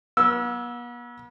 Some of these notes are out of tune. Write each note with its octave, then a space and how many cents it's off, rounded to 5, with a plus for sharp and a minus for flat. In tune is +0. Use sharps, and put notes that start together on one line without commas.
B3 -40 E6 -10